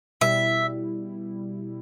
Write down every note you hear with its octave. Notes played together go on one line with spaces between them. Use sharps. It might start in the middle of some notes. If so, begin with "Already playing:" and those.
B2 G3 E4 E5